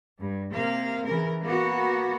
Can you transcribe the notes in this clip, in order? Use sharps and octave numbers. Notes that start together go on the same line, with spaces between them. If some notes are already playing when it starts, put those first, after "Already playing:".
G2
C3 A#3 F5
C#3 E3 A#4
A#3 B3 F#4